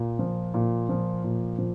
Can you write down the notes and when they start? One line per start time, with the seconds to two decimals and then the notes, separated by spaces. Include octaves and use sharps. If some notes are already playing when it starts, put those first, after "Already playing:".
Already playing: A#2
0.19 F3
0.54 A#2
0.89 F3
1.24 A#2
1.58 F3